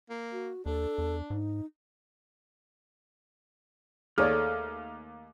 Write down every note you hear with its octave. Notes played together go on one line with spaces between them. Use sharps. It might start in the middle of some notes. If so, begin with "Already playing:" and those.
A#3
F#4
D#2 D4 A4
E2
G#2 D#4
D#2 A3 G#4 C#5 D5 F6